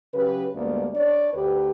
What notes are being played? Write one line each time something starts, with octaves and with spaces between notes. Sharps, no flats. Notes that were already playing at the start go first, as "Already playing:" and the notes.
C#3 F#3 G4 B4
D2 G2 G#3 A#3 B3 D5
D4 C#5 D5
D2 G4 B4